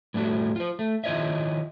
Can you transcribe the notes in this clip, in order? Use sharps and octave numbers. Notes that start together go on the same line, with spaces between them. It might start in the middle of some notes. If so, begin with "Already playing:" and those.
A2 G3 A3 E4 F#4
F4 C5
A3
D#3 E4 F4 C#5 D#5 E5